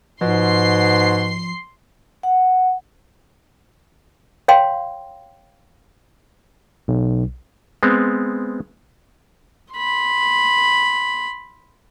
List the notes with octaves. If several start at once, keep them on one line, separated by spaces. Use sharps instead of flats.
G#2 B2 F3 C6 C7
F#5
C#5 F5 G5 C6
B1
G#3 B3 C4
B5 C6